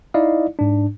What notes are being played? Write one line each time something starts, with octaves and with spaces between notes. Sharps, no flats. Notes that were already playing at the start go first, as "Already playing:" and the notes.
D#4 E4 D5 D#5 F5
G#2 D4